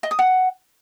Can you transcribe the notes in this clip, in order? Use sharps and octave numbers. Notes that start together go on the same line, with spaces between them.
D#5
D#6
F#5